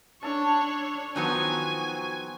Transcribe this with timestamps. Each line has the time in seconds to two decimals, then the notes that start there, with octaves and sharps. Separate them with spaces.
0.23 D4 A4 C#5 A5
1.16 D#3 F3 F#3 B3 F#4 G#5